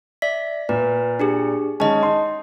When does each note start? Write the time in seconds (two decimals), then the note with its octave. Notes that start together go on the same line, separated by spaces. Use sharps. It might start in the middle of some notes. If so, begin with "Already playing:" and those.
0.22 D5 E5 B6
0.69 A#2 B4
1.20 D4 G4 G#4
1.80 D#3 G#3 C#4 D#5 A5
2.03 D#4 C6